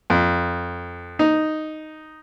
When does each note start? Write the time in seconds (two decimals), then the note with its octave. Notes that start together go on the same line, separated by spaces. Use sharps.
0.10 F2
1.19 D#4